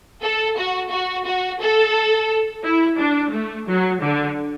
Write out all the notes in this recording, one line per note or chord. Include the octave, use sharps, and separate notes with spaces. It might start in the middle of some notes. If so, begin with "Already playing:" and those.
A4
F#4
F#4
F#4
A4
E4
D4
A3
F#3
D3